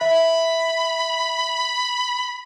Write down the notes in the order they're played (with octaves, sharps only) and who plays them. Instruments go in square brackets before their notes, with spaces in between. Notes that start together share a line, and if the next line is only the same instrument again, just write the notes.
[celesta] E5 [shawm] B5